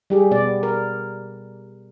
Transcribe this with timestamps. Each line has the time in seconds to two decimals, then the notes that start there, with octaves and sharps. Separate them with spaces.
0.10 G3 G4 G#4
0.31 B2 B3 D5
0.63 A#4